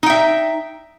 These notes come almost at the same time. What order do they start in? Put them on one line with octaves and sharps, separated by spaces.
D#4 G5 E5